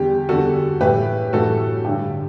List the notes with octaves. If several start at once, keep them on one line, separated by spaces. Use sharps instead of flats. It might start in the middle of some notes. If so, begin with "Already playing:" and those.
Already playing: E2 D3 G3 G4
E2 D3 G3 F#4 A4
A2 E3 G3 G4 B4
A2 E3 G3 F#4 A4
G2 D3 G3 G4